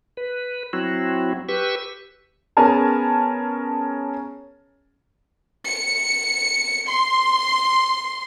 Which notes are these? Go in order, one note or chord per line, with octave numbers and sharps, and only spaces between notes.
B4
F#3 C4 E4 F#4
G4 B4 C#6 E6
B3 C#4 G#4 A#4 G#5 A5
C#7
C6